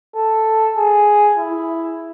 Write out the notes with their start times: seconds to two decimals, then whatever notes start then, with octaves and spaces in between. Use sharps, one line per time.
0.16 A4
0.77 G#4
1.38 E4